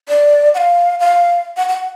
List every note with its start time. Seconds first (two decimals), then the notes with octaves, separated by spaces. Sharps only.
0.08 D5
0.54 F#5
0.58 F5
1.00 F5
1.57 F#5
1.69 F#5
1.79 F#5